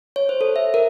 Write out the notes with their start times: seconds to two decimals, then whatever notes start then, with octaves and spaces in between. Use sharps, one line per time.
0.16 C#5
0.29 C5
0.41 A4
0.56 E5
0.74 A#4